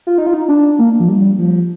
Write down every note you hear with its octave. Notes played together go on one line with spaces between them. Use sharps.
F4
D#4
F4
D#4
D4
A#3
F3
G3
F3